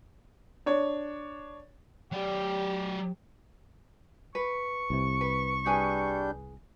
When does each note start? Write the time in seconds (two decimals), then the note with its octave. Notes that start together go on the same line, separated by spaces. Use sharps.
0.66 D4 C#5
2.12 F#3 G4 D5
4.35 B4 C#6
4.90 C2 C3
5.21 B4
5.66 G3 D4 G#4 B4 G#5 G6